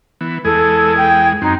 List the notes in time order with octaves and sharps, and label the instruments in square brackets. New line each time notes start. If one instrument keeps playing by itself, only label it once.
[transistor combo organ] E3 B3
[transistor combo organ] E2 G#3 G#4 [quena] A4
[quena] G5
[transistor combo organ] F#2 C4 [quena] D#4